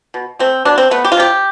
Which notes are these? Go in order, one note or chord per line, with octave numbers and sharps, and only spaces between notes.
B2
A3 C4
B2 D4
C4
A3 B3
G4
F4
C3 G4